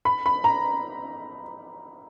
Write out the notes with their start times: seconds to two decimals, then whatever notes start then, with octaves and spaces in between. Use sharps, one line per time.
0.05 B5
0.26 B5
0.44 A#5